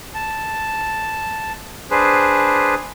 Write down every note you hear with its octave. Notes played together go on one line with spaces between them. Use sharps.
A5
D4 G#4 B4 C5